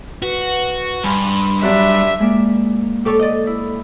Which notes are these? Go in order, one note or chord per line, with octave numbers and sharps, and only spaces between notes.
F#4 B4
G2 G#5 B5 C6
F#3 G3 D4 E5
G#3 A#3 D5
G3 A4 C#5 D6
D5 D#5
E4